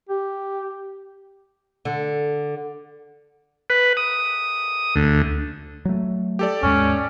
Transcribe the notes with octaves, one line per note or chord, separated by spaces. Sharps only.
G4
D3
B4
D#6
D2
F#3 A3
G4 A4 D5
D#2 G#2 G#3 C#4